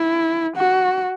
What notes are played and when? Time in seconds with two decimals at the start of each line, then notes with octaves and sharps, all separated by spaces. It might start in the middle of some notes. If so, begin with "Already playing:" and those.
Already playing: E4
0.57 F#4